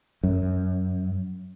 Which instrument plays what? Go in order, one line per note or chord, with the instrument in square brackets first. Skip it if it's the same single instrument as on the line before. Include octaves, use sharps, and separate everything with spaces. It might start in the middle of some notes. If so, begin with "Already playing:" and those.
[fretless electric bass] F#2